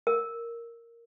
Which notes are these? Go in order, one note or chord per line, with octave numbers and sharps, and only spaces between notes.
A#4